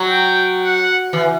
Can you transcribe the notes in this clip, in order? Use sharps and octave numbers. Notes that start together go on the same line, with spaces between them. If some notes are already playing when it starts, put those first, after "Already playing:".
Already playing: F#3
G5
F#5
E3